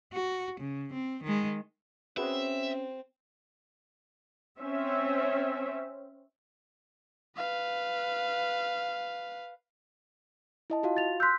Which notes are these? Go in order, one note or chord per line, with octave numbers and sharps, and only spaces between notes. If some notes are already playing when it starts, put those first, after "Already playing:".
F#4
C#3
C4
D#3 G#3
C4 C#4 F#4 G#4 B4 E5
C4 C#4 E5
B4 F5
E4 D#5 A5
F4 F#4 F5
A6 F7
C6 E6 F#6 G6 B6